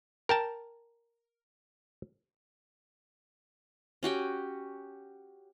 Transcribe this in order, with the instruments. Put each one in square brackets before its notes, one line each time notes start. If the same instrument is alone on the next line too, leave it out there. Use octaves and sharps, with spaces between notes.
[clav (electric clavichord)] A#4 G5 A5
[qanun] C#4 F#4 G4 G5